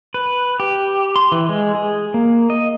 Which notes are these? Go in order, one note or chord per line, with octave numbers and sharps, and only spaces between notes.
B4
G4
C6
E3
G#3
G#4
A#3
D#5